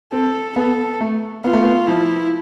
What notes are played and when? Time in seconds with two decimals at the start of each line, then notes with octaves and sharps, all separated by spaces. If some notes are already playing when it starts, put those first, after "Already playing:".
0.12 C4 A4
0.56 B3 A4
1.01 A3
1.44 B3 F4
1.53 A3
1.63 B3
1.87 F3 E4